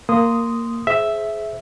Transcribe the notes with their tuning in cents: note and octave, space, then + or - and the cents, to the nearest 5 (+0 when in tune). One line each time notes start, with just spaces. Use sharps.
A#3 -10 C6 -15 D#6 +0
G#4 +25 C5 +0 E5 +0